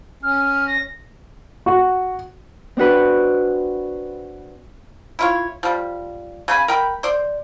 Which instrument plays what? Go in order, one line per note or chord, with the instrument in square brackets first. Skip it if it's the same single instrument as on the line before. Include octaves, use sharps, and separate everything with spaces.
[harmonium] C#4 [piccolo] F6
[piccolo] A#6
[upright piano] F#4
[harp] C4 D4 F#4 B4
[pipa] E4 F4 C#5
F3 G3
C#3 G#5 B5
A#4 G5 B5
C5 D5